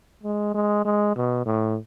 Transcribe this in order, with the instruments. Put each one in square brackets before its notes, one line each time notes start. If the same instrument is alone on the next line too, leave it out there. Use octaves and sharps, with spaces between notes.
[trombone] G#3
G#3
G#3
B2
A2